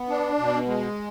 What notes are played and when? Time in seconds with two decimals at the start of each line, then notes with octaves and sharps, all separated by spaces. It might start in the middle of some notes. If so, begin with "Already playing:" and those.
Already playing: B3
0.09 D4
0.38 B2
0.67 G#3